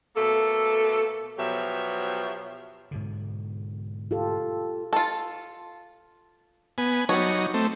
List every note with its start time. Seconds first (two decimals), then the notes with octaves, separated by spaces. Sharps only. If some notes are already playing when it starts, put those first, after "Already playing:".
0.16 B2 A3 A#3 A4
1.39 B2 F3 F#3 G4 E5
2.91 G#2 B2 D3
4.11 F4 G4 A4
4.93 F4 A4
6.78 B3 G#5
7.09 F#3 G3 D#4 C#5
7.54 A3 C4